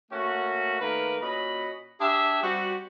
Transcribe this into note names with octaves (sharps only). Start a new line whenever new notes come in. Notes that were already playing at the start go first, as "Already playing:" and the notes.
A3 A#3 C#4 F#4
D#3 A3 A#3 A#4 B4
A#2 C#4 F#4 D#5 B5
D4 G4 G#4 E5
G3 C4 F#4